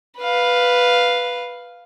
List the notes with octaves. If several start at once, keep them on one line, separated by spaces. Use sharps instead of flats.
B4 F5